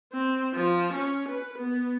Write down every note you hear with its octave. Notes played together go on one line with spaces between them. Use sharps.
C4
F3
C#4
B4
B3